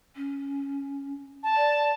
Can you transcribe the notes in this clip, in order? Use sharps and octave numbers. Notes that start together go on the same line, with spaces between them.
C#4
A5
D5